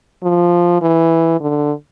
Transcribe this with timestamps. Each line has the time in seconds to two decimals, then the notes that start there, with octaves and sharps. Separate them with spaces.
0.23 F3
0.82 E3
1.41 D3